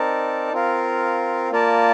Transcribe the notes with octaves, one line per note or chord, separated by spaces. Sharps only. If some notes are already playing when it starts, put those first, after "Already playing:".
Already playing: C4 D#4 A#4 D5 A5
C4 F4 A#4 F5
A#3 F4 A#4 D5 A5